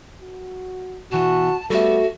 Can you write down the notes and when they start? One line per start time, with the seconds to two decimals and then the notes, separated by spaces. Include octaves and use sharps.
0.21 F#4
1.12 B2 E3 F#4 A5
1.70 G3 A3 B3 F#4 A4 E5